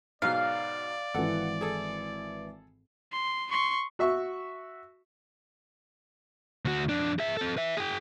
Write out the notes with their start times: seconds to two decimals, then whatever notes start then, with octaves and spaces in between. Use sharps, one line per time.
0.22 G#2 B2 F#3 D5 F5
1.14 G#1 E3 A4 F#5
1.61 G#4 A4
3.13 C6
3.50 C6 C#6
3.99 F#4 E5 C#6
6.65 D2 F#4
6.89 F2 D4
7.19 G#4 E5
7.37 C4 A4
7.57 B4 E5
7.77 G#4 G5